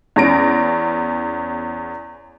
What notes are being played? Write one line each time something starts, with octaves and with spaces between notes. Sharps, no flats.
E2 C#4 A#6 D7